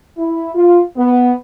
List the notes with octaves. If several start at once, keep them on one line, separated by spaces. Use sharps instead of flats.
E4
F4
B3